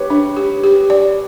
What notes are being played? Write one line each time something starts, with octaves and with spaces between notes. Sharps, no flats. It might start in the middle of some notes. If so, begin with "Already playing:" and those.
Already playing: G4 B4 C#5
D4
G4
G4
D5